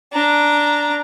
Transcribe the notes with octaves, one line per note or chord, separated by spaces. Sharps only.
D4 A#5